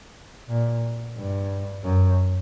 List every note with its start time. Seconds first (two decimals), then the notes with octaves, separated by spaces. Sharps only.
0.48 A#2
1.16 G2
1.84 F#2